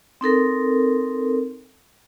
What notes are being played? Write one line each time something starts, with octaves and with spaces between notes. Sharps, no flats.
C4 D#4 A4 A#4